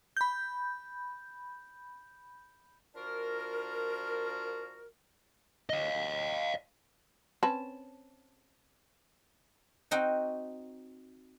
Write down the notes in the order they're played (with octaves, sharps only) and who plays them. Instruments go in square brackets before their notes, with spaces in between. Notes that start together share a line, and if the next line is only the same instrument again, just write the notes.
[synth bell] B5 G6
[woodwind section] F3 D4 F4 F#4 A#4
[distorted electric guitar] D#5 F5
[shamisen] C4 C#4 B4 [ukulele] A5
[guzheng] C4 D#4 F#4 G5